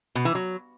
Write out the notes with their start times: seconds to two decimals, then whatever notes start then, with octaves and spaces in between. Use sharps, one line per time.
0.15 B2
0.25 E3
0.35 F#3